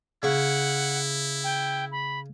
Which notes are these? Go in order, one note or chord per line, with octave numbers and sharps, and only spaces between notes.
C#3 E4 F#5 C#6
G5
B5